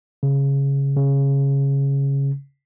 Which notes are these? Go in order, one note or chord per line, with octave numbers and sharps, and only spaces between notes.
C#3
C#3